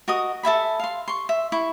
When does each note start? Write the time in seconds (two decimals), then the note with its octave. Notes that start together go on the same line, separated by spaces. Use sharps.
0.08 F#4 A#4 D#5 D#6
0.43 A4 E5 G#5 B5
0.80 F5 C6
1.08 C6 C#6
1.29 E5
1.52 E4 C#6